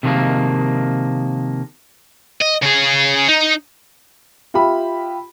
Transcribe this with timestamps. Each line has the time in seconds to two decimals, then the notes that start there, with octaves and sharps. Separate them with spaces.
0.03 C3 D#3 F3 G3 G#3 A#3
2.41 D#5
2.62 C#3 G#4
3.28 D#4
4.54 F4 G4 E5 B5